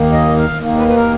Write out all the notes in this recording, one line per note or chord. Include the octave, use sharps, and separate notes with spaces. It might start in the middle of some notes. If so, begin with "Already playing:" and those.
Already playing: D#2 D#3 A#3
D#5
F5
D#2 D#3 A#3
B4
B4
A#4